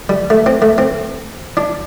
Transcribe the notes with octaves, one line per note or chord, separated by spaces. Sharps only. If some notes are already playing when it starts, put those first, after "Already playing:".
G3
A3
C4
A3
C4
D4